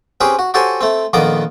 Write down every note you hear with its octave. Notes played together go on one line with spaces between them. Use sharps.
C4 C#4 G4 G#4 B4 C5
F#4
F#4 G4 A4 C5 C#5 G#5
A3 C4
A#1 F2 D#3 B3 D#5 D6